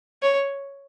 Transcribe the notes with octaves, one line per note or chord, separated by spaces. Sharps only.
C#5